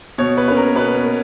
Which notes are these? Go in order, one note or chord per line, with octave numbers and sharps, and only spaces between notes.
B2 C#5
B4
A#3 C#4 B4
A#4
B2 B4
A#3